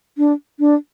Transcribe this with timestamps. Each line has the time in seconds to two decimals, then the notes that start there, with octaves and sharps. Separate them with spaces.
0.18 D4
0.60 D4